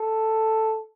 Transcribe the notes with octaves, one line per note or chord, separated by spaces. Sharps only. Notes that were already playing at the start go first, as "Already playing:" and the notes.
Already playing: A4